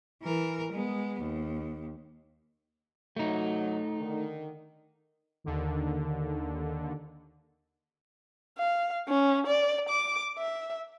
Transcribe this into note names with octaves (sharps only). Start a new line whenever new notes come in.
E3 A#4
G#3 B3
D#2
F#3 A3 D#4
D3 D#3
D#2 D3 D#3
F5
C#4
D5
D6
E5